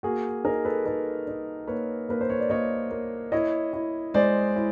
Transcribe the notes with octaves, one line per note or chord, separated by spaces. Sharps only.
A#3 F#4 G#4
D#4 G#4 A#4
A4 B4
D#4 A4 B4
D#4
A#3 B4 C#5
A#3 B4
C5
C#5
D5
A#3 C#5 D#5
A#3
E4 C#5 D#5
E4
G#3 C5 D5
E4